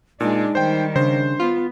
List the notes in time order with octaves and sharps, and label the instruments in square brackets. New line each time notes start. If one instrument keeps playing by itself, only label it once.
[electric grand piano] A#2 [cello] G#3 D4 [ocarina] D#4
[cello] D#3 G3 [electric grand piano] C5 G5
[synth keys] C#3 [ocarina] D4 [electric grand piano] C5
[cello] B3 [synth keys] F4